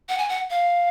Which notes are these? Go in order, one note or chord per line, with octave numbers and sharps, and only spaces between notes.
F#5
G#5
F#5
F5